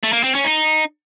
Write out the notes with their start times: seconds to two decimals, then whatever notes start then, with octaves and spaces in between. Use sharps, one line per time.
0.03 A3
0.13 A#3
0.24 C4
0.35 C#4
0.44 D#4